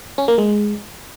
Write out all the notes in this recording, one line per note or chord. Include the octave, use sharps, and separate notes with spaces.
C#4
A#3
G#3